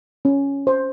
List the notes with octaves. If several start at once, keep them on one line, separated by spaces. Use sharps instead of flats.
C#4
C5